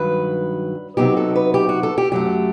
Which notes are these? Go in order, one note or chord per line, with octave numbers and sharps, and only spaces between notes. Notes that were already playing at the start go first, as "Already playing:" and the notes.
Already playing: G2 D#3 F#3 B4
C3 F#3 B3 D#4 G4
A4
B4
G4
F#4
A4
G4
F#2 F#3 A3 G4